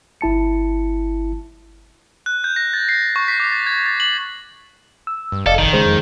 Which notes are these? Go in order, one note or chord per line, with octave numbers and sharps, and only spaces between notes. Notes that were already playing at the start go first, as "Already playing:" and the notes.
G1 E4 A5 C#7
F#6
G6
A#6
A6
C7
C#6
B6
D6
A6
G#6
A6
F#7
E6
G2
F1 A4 D5 D#5 F5
A1 D#3
C#3 G#3 G#4 C5
F2